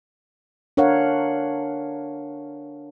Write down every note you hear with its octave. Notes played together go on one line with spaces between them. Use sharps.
D4 A#4 C#5 F5 F#5